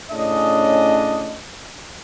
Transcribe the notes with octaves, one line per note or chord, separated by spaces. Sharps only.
A2 C#3 C#4 D4 D#5